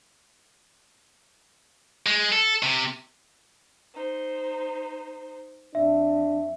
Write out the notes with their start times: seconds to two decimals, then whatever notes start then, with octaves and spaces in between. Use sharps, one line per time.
2.06 G#3
2.32 A4
2.63 C3
3.94 D#4 C5
5.75 F2 D4 E5